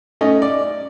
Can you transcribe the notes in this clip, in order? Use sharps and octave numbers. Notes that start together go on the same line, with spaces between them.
A3 C#4 D#4 D#5
D5